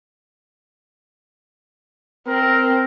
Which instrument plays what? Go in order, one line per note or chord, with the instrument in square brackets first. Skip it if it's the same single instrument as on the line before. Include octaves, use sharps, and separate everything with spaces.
[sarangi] C4 [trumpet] A#4